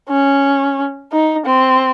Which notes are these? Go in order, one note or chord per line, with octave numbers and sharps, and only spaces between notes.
C#4
D#4
C4